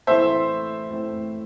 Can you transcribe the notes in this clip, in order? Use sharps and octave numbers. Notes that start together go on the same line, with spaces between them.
A2 E3 A3 C4 C5 E5
A2 E3 A3 C4